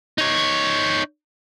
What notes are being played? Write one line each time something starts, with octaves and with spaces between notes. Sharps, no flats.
D#4 C#5